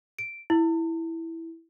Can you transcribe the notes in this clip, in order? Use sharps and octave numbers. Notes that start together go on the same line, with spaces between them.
D7
E4